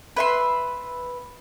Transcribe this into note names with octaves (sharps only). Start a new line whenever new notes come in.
B4 E5 C6